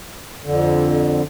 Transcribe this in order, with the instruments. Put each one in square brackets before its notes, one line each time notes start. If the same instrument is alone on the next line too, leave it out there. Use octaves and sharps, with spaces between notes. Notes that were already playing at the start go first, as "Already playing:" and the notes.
[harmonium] F2 D3